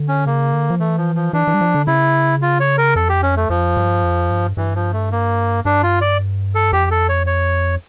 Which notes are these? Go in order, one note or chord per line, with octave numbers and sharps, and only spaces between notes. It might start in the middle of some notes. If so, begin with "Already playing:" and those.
Already playing: D3
C#4
C#3 A#3
D3
F3
E3 A3
F3
F3
E3 D4
E3
G3
F3
D3
C#3 E4
F4
C#5
A#4
F2 A4
G4
C#4
A3
F2 F3
G2
F2
G2
G2 E3
F3
A3
A#3
G2 D4
F4
D5
A4
F2 G4
A4
C#5
C#5